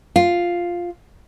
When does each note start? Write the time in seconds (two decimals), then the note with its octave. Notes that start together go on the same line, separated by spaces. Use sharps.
0.16 F4